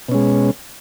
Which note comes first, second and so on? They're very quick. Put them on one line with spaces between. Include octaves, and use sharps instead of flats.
B2 C#4 G#3